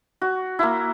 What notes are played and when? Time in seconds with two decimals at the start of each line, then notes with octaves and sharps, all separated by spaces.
0.21 F#4
0.59 A#3 E4